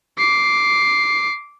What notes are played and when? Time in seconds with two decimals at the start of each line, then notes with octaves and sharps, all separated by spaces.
0.18 D6 C7